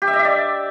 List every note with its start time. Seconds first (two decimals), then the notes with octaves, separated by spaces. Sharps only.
0.02 G4
0.07 E5
0.13 D#5
0.19 E5
0.25 D5